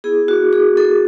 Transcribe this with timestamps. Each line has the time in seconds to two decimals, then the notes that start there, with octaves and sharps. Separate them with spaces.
0.04 B3 E4 G#4
0.28 F#4
0.53 G#4
0.77 A4